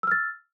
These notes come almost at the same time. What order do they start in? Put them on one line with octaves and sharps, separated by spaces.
E6 F6 A6